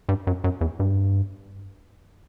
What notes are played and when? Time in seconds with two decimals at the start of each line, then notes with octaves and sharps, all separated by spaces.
0.09 G2
0.27 F#2
0.44 F#2
0.61 E2
0.80 G2